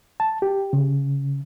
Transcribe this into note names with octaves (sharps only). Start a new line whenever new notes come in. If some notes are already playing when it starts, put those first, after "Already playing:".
A5
G4
C#3